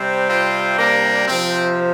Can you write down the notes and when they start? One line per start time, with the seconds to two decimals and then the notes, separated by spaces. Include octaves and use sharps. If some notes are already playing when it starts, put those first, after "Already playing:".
Already playing: C3 G3 C4
0.29 C4 F4
0.77 A#3 D4
1.26 C3 F3 C4